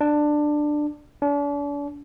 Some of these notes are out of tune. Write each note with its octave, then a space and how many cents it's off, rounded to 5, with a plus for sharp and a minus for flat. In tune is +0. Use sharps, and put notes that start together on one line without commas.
D4 +15
D4 -40